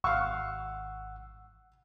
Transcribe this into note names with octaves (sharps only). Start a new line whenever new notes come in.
G#1 F5 F#5 C#6 E6